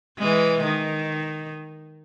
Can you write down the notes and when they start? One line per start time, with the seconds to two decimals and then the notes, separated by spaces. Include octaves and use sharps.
0.18 E3 G#3
0.64 D#3